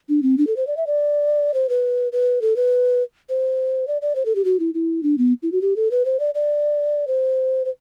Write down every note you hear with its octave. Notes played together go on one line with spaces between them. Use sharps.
D4
C4
D4
A4
C5
D5
E5
D5
C5
B4
B4
A4
B4
C5
D5
D5
C5
A4
G4
F#4
E4
E4
D4
B3
E4
F#4
G4
A4
B4
C5
D5
D5
C5
C5